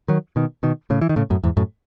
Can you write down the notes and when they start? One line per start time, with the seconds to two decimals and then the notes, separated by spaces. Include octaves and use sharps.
0.08 D#3 F#3
0.36 B2 D#3
0.63 B2 D#3
0.90 A2 C#3
1.01 E3
1.09 D#3
1.16 A2 C#3
1.30 F#2 A2
1.44 E2 G#2
1.57 F#2 A2